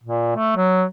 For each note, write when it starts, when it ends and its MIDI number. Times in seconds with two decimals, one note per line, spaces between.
0.03 0.32 46
0.36 0.54 57
0.56 0.84 54